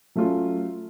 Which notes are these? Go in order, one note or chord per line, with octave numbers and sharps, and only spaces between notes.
F#3 A3 C#4 F4